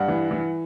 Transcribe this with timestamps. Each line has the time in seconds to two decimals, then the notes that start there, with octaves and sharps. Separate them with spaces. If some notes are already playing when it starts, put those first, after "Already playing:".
Already playing: G2 F#5
0.08 E3
0.31 E3